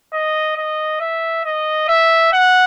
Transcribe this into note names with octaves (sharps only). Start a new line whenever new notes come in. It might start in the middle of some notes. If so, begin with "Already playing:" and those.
D#5
D#5
E5
D#5
E5
F#5